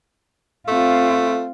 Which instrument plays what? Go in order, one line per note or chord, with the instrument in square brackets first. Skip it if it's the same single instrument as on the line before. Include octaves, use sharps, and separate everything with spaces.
[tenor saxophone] A3 [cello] C4 F4